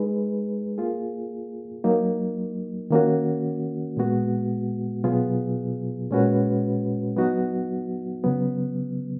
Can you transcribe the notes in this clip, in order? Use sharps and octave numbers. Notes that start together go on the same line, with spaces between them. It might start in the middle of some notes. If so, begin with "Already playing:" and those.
Already playing: G#3 D#4 G#4 B4
A#3 F4 G#4
F#3 A#3 D#4
D#3 A#3 C#4 F#4
A#2 G#3 B3 F#4
B2 F#3 B3 F4 G#4
A#2 G#3 C#4 F#4 B4
F#3 B3 D#4 F#4
C#3 F#3 B3